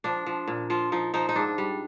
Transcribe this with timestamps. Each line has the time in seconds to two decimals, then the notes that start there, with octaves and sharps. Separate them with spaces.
0.04 F3 D4
0.26 F3
0.48 A#2
0.70 F3 F4
0.92 F3 D#4
1.14 F3 D#4
1.29 D#4
1.36 G#2 D4
1.58 G3